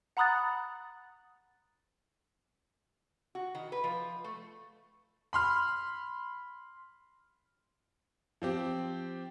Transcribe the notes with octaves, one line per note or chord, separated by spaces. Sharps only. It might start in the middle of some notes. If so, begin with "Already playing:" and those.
F#5 A#5 B5 D#6 F#6 A6
F#4
D#3
B4
F3
A3
B5 C6 F6
F3 C4 G4